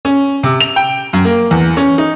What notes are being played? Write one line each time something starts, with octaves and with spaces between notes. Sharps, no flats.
C#4
C3
F7
G5
F#2
A#3
E2
C#4
D#4